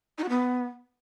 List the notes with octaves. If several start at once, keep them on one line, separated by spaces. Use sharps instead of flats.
D#4
F#4
B3